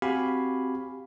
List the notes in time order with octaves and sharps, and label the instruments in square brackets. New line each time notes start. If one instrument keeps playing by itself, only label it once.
[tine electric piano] C4 F#4 G4 F5 G#5 B5